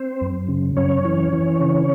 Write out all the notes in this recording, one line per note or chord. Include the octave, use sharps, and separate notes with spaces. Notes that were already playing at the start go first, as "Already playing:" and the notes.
Already playing: C4 C5
F#2
C#3
F#2 C#4 C#5
E3
E3
C#3